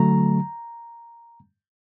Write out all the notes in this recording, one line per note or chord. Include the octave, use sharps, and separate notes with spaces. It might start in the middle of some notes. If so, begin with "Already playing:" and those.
Already playing: D3 F#3 A3 A#5